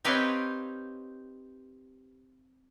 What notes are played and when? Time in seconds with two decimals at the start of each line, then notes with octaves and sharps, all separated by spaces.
0.05 C4 D#4 G4 B4 C#5 F5